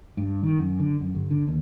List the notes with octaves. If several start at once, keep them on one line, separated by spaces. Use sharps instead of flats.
G2
D#3
F#2
D3
F#2
G1
D3
D#2